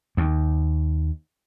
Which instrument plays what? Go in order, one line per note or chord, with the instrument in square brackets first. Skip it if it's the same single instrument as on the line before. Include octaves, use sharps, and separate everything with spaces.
[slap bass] D#2